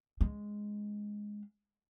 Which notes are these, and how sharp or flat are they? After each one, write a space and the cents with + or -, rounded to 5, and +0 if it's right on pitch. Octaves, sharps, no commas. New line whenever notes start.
G#3 +0 C#4 +0